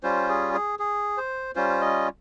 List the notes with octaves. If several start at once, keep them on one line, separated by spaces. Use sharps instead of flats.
G3 C#4 F4 C5
G#4
G#4
G#4
C5
G3 C#4 F4 C5
D#5